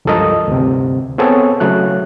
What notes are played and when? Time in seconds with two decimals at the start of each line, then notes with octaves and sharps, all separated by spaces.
0.05 C#2 G2 F3 A4 A#4 D#5
0.48 D2 G2 C3
1.18 B3 C4 G#4 A4 C#5
1.60 C#3 F#3 A3 F#6